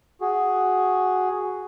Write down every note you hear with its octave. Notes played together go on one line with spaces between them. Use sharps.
F#4 G#4